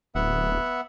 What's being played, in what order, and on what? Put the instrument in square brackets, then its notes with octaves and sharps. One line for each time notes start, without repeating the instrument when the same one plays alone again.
[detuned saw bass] D1 [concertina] B3 E5 F#5